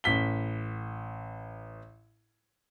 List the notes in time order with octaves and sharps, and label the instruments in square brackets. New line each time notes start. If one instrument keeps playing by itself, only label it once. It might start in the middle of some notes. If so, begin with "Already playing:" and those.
[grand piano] A1 B6 G7